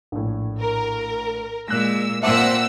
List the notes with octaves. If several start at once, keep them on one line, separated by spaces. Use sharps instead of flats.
A#1 A2
A#4
A#2 G#3 E6 F#6 A#6
A#2 C4 E5 F#5 A5 D6 E6